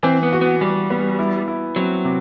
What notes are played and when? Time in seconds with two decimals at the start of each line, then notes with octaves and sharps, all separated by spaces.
0.03 E3 C4
0.23 B3
0.33 F#4
0.41 B3
0.61 E3 G3
0.90 B3
1.19 E4
1.48 E4
1.76 F#3 C4
2.05 C3